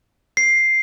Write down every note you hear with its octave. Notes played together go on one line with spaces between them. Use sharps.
C7